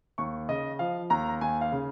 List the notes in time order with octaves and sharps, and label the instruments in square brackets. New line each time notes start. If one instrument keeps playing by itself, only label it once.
[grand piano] D#2 C#6
C#3 D#5
F3 F5
D#2 A#5
D#2 G#5
F5
C#3